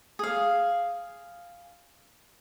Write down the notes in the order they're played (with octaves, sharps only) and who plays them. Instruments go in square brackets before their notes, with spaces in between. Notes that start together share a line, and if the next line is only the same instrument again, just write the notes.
[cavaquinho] G#4 F5